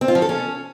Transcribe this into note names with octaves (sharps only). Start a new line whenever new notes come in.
C4
F4
F3
A4
C#4